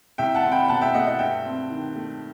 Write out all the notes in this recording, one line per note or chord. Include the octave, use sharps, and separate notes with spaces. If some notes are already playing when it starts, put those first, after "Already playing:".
C2 E5 G5
F#5 A5
C4
G5 B5
B2 F#5 A5
E5 G5
A3 D#5 F#5
D#5 F#5
G2 E5 G5
C4
D#3
A3